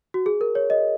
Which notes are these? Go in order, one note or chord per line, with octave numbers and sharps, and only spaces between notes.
F#4
G#4
A#4
C#5
D#5